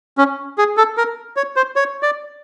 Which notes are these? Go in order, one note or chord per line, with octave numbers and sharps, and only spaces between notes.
C#4
G#4
A4
A#4
C#5
C5
C#5
D5